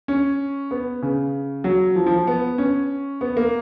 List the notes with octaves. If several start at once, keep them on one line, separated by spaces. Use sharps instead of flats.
C#4
B3
C#3
F#3
F3
F3
B3
C#4
B3
A#3